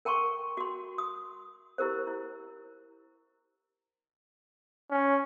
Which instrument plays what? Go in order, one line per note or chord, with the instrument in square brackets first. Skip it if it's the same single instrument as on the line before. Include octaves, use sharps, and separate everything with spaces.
[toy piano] A#4 G5 A5 C6 C#6
F#4 C6
D#6
E4 G4 A#4 C5
E4
[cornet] C#4